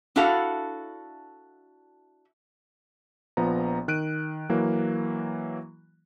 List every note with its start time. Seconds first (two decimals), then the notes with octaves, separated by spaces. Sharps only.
0.16 D4 E4 F#4 A4 F5 F#5
3.37 A#1 F3 B3 A#5
3.88 D#3 F#6 D7 D#7
4.49 E3 F#3 A#3